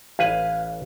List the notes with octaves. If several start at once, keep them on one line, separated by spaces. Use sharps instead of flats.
A1 B4 F5 G#5